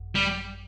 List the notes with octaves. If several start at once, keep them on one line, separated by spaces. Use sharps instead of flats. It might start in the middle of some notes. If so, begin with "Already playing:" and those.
Already playing: G#1 F#2
G3